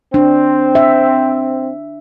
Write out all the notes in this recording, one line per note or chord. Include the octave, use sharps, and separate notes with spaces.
C4 D4
E5